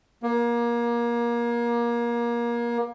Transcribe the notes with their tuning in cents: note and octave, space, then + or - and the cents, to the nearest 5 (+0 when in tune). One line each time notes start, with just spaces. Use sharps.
A#3 +25